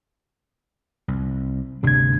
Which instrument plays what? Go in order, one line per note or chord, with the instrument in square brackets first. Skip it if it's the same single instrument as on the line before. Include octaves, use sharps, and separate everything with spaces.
[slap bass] C2
[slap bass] G1 D2 D4 [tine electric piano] C3 G#6